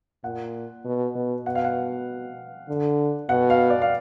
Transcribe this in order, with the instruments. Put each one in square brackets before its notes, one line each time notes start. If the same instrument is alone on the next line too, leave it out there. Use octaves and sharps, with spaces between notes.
[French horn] A#2 [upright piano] F#5
[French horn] B2
B2
[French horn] B2 [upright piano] F#5
[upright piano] F5
F#5
[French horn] D3
[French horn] B2 [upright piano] F#5
[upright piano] F5
D5
F5